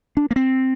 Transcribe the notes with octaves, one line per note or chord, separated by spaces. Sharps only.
D4
A#3
C4